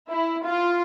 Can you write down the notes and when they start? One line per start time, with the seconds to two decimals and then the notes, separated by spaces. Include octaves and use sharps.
0.11 E4
0.47 F4